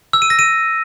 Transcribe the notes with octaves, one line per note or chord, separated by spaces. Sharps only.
E6
D#7
A#6
D#7